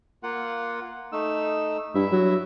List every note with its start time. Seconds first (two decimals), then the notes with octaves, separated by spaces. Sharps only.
0.23 A#3 F4 F#5
1.12 A3 D#4 E6
1.95 G2 E4 E5
2.12 F#3